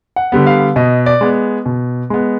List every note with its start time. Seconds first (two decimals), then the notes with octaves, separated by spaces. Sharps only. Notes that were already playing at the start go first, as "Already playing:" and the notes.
0.16 F#5
0.32 D3 G3 B3
0.46 F5
0.76 B2 D#5
1.06 D5
1.21 G#3 B3
1.66 B2
2.10 G#3 B3